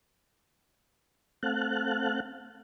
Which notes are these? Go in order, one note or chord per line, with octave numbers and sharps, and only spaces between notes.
A3 C4 F5 F#5 A5 F#6